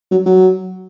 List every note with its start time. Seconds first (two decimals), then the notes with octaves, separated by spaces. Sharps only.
0.11 F#3
0.26 F#3